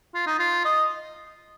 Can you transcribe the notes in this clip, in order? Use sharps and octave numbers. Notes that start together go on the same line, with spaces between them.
F4
D#4
F4
D#5